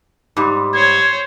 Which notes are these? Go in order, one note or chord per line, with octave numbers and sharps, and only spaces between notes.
G#2 G3
C5 C#5 G#6